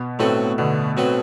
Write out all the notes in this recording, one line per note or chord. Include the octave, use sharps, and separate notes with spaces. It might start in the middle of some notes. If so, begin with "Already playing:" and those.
Already playing: B2 B3
A2 F#3 A3 C4 F#4 B4
B2 D3 B3
F#3 C4 F#4 B4